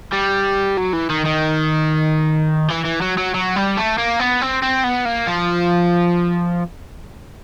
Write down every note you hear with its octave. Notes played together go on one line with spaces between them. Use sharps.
G3
F#3
E3
D#3
D#3
E3
E3
F#3
F#3
F#3
G3
A3
A#3
B3
C4
C4
B3
A#3
F3